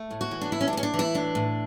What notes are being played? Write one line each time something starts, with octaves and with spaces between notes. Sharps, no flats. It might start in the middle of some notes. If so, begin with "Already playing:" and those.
Already playing: A3
A2
F#4
E3
D4
A2 E4
C#4
D4
A2 C#4
D4
E3
E4
A2 D4
A2